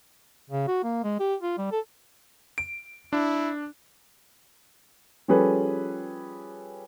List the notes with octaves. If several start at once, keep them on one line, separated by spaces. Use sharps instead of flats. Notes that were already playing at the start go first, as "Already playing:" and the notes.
C#3
F#4
A#3
G#3
G4
F4
G3
A4
D7
D4 E4
F3 G3 C#4 G#4 A4 B4